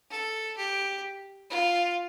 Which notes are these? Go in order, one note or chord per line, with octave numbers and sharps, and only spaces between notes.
A4
G4
F4